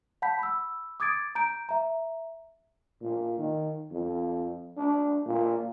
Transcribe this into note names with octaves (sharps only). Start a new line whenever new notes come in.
F#5 A5 B5 G6 B6
B5 E6
D6 D#6 G#6 A6 D7
A#5 G6 D7
E5 A#5
A#2
D#3
F2
D4
A#2